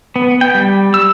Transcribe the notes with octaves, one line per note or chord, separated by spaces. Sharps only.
B3
G5
G3
E6